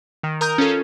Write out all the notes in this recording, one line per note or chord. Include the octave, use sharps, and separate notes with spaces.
D#3
A#4 A#5 D#6 G6
C#4 F4 A4